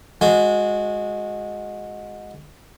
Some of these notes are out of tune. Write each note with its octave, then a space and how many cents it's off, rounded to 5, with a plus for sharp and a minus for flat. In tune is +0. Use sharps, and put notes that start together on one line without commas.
G#3 +0 F#4 -25